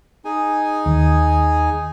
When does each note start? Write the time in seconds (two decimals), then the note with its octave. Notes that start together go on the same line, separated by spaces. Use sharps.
0.25 D#4 G#4 G#5
0.86 D#2